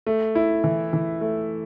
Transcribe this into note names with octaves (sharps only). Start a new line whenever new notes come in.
A3
E4
E3
E3
A3